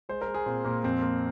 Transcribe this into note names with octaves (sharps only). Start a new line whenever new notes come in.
G#3 C5
A#4
G#3
G#4
A#2 C4
A#2 A#3
F2 C4
A#3